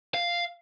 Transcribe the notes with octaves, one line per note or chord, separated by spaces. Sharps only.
F5